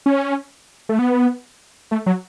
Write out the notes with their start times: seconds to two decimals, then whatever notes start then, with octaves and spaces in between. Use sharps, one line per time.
0.06 C#4
0.89 A3
0.99 B3
1.91 A3
2.06 F#3